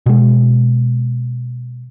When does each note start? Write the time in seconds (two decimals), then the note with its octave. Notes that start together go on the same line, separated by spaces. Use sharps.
0.06 B2 G#3